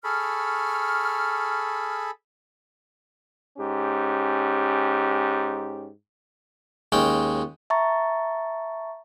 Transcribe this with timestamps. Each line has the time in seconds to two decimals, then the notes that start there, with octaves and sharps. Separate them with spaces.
0.04 G#4 A4 B5 C#6 F6
3.58 G#2 C#4 G4
6.92 D#2 G#3 C#4 G5
7.70 E5 A5 A#5 C#6 A6